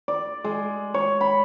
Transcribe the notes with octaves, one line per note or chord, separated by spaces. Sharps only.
D5
G#3
C#5
B5